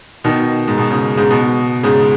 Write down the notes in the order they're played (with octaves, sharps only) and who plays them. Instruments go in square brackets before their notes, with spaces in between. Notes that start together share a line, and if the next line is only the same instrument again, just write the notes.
[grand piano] B2 D#3
G#2
B2
G#2 C#3
G#2 C#3
B2
G#2 C#3